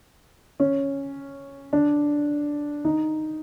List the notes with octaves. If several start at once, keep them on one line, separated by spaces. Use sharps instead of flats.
C#4
D4
D#4